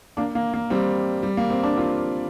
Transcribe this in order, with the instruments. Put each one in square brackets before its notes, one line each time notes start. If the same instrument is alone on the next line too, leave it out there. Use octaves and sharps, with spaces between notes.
[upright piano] A#3 D4
A#3
A#3
G3 C4
G3
A#3
C4
D4
C4 F4